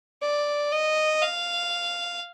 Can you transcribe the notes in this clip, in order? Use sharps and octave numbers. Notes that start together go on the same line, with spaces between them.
D5
D#5
F5